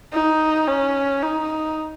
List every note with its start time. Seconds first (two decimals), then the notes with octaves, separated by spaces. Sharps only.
0.14 D#4
0.68 C#4
1.22 D#4